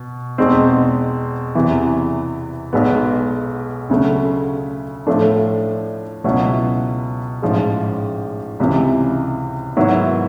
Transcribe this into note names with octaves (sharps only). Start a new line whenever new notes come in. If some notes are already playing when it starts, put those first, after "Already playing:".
Already playing: B2
E2 B2 G#3 C4 D#4
E2 C3 E3
B1 B2 G#3 B3
D2 C#3 F#3 A3
A2 F3 A3 D4
C#2 B2 F#3 B3 E4
A1 G#2 F3 G#3
C#2 C3 E3
G#2 D#3 F#3 B3 E4